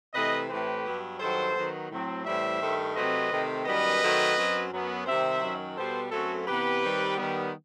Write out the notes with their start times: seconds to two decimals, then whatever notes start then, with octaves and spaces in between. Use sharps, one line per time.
0.14 C3 E3 A3 B4 D#5
0.49 A2 E3 A3 C4 G4 B4
0.85 G2 F#3 B3
1.20 G2 D#3 F#3 A4 C5
1.54 D#3 F#3 B3
1.91 A2 F#3 C4
2.26 A2 E3 G3 C4 C5 E5
2.60 G2 D#3 A3
2.95 C3 F#3 A3 C4 B4 D#5
3.31 C3 D#3 A3 C4
3.66 F#2 D#3 G3 B3 B4 D#5
4.01 D#3 F#3 A3 C4
4.36 F#2 F#3 C4
4.71 F#2 F#3 B3
5.06 C3 D#3 G3 C4 C5 E5
5.41 F#2 D#3 F#3
5.77 B2 G3 B3 A4 C5
6.11 F#2 F#3 A3 C4 F#4 A4
6.47 C3 E3 B3 G4 B4
6.82 D#3 G3 C4
7.17 D#3 G3 B3